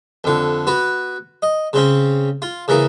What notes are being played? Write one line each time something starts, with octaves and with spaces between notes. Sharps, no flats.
F2 D3
B3 F#4 B4
D#5
C#3 C4 C#4
F4
C#3 E3 A#3 G#4